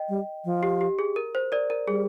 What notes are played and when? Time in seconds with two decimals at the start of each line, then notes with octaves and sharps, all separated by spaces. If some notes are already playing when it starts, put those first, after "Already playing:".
Already playing: D#5 G5
0.09 G3
0.45 F3
0.63 G4
0.81 G4
0.99 G#4
1.16 A#4
1.35 C5
1.52 A#4 D5
1.70 A#4
1.88 G3 G#4